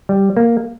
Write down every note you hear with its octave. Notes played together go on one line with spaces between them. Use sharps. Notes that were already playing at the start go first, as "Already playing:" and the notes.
G3
A#3